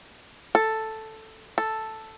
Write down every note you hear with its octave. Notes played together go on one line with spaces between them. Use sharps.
A4
A4